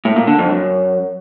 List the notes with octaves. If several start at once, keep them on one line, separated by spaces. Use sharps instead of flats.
A2
A#2
D3
F2
F#2